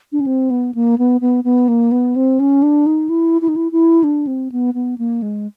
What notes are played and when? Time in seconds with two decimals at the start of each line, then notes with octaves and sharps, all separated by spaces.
0.12 D4
0.20 C#4
0.26 C4
0.50 B3
0.75 A#3
0.98 B3
1.21 B3
1.44 B3
1.68 A#3
1.92 B3
2.16 C4
2.40 C#4
2.63 D4
2.86 D#4
3.09 E4
3.42 E4
3.48 D#4
3.56 E4
3.72 E4
4.04 D4
4.27 C4
4.52 B3
4.74 B3
4.98 A#3
5.22 G#3